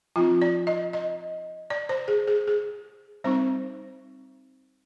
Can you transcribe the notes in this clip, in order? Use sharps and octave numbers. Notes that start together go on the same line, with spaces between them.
F3 C4 D#4 F4
D5
D#5
D#5
D5
C5
G#4
G#4
G#4
G3 C4 D#4 C5